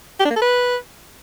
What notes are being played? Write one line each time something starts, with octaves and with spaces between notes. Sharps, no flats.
G4
D4
A#3
A4
B4